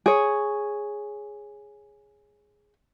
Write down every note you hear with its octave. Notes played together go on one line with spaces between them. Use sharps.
G#4 C#5